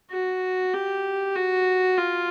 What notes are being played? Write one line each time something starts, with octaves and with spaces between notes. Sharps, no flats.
F#4
G4
F#4
F4